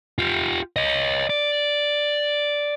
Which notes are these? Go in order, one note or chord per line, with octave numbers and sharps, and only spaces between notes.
F4 G4
C#5 D#5
D5